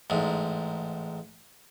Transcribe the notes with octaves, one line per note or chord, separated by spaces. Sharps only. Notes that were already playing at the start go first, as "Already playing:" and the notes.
A1 G#2